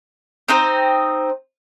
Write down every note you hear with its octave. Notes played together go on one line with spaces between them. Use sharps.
C4 D#4 C5